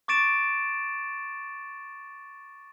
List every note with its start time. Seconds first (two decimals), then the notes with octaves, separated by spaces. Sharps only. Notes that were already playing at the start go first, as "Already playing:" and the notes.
0.08 C#6 D6 A6 D7 E7